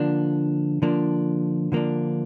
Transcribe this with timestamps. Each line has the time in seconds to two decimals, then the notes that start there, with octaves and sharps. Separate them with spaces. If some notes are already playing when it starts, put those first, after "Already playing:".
Already playing: D3 F3 A#3 D4
0.82 D3 F3 A#3 D4
1.72 D3 F3 A#3 D4